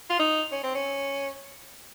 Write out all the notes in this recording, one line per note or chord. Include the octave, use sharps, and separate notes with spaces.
F4
D#4
C#4
C4
C#4